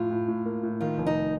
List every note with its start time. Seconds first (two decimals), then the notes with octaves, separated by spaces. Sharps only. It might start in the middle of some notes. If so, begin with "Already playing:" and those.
Already playing: A2 F3 F4
0.11 A2
0.28 A2
0.46 A#3
0.63 A2
0.81 D#3 F4
0.98 F1
1.06 D#4